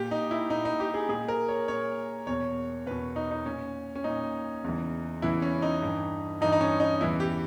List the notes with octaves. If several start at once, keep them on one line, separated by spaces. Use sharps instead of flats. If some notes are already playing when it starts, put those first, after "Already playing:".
Already playing: A#2 G4
D#4
E4
A#2 D#4
D#4
G4
G#4
A#2 G#4
A#4
C#5
A#2 C#5
E2 B2 C#5
E2 B2 B4
D#4
D#4
A#2 C#4
C#4
A#2 D#4
E2 C#3 E3
E2 C#3 E3 E4
C#4
D#4
G2 E3
G2 E3 D#4
D#4
C#4
D#4
E2 C#3 E3 E4
G4